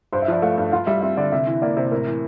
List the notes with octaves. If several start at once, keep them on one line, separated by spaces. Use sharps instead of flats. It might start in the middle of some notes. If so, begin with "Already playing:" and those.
G2 C5
E5
F3 D5
A3 F5
G2
F4 F5
G3 E5
C4 E5
D3 D5
C3 E5
E3
A#3 D5
C3 C5
A2 A#4
E3